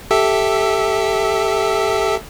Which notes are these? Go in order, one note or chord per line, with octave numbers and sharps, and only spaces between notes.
G4 A4 E5